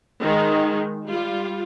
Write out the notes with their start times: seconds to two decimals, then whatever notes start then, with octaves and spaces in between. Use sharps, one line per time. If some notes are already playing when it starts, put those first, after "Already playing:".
0.21 D#3 G#3
1.06 G3 F4